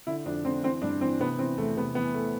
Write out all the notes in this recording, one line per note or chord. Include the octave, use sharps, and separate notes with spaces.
D3 E4
F2 D4
D3 C4
E3 C4
G2 D4
E3 C4
C3 B3
E3 C4
E2 A3
C3 B3
E3 B3
A3